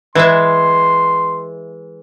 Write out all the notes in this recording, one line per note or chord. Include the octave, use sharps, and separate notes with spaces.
E3 G#3 E5 C6